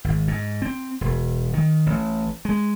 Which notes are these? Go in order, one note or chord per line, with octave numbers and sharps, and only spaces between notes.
G#1
G#2
C4
E1
D#3
A1
G#3